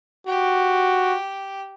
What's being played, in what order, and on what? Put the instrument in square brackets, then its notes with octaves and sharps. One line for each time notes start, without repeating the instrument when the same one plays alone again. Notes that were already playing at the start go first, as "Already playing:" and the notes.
[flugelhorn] F#4 [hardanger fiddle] G4